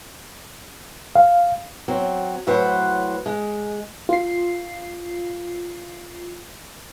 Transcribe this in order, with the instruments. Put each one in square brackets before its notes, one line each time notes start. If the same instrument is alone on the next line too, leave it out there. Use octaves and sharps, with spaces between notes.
[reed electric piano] F5
[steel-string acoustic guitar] F#3 C4
A2 F#3 B4 C5 F#5
G#3
[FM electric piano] F4 C7